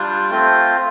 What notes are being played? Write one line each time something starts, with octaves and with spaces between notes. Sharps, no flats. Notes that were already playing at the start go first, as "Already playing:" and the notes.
Already playing: G3 D4 F4 G5
A3 C4 F4